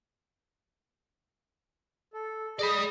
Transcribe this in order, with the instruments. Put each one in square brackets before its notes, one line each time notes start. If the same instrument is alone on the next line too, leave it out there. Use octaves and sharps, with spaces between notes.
[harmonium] A4
[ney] G#4 [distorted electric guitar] D5 B5 [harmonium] D#5